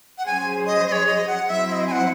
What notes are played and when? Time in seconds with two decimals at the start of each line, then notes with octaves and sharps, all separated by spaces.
0.18 F#5
0.26 F#3 C#4 G#4 C5 G#5
0.66 D#5
0.87 D#5
0.92 C#5
1.06 D#5
1.27 F#5
1.47 F#3 C4 E4 C5 E5
1.67 E5
1.72 D#5
1.87 G#5
1.91 F#5